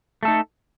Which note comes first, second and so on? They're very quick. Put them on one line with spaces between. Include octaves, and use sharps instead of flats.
A3 A4 D#4